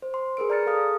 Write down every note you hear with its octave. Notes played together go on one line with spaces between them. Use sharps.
C5
C6
G#4 A#4 B4 D7
D5 A#5 F6 A6 C#7
G#4 A4 F5 D#6 F6